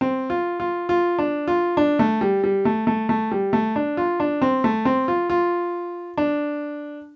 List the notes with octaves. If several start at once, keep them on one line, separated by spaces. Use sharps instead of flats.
C4
F4
F4
F4
D4
F4
D4
A3
G3
G3
A3
A3
A3
G3
A3
D4
F4
D4
C4
A3
C4
F4
F4
D4